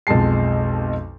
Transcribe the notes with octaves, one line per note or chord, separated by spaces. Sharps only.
B1 F2 G#3 A5 C7